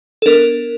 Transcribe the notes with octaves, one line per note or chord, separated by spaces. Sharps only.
A4
B3 D4 A#4